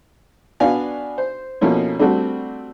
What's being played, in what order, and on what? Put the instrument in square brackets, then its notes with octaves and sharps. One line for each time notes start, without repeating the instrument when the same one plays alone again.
[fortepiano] B3 D4 F#4 D5 F5 G#5
C5
F2 B2 F3 A#3 C#4 E4
G3 A3 C4 D4 F#4